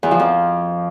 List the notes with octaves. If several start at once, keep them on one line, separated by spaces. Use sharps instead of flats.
E2
F3
F2